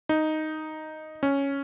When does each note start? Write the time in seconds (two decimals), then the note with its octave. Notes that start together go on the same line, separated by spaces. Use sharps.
0.09 D#4
1.23 C#4